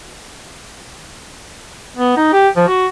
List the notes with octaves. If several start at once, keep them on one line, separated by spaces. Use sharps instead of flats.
B3
D#4
G4
F3
F#4